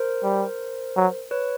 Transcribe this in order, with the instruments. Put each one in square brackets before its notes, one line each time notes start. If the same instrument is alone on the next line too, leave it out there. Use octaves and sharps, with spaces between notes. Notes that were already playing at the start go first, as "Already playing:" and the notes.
Already playing: [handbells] A#4 C5
[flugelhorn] G3
F#3
[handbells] B4 C#5